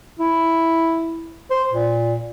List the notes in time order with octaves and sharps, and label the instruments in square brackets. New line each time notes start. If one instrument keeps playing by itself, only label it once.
[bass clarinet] E4
C5
A#2